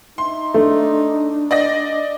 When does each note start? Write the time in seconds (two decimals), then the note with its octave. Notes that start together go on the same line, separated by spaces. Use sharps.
0.18 D#4 E5 C6
0.54 A3 D4
1.51 D5 D#5 A#6